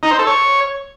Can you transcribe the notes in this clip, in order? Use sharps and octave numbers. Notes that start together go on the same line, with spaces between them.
D#4
C5
A4
C#5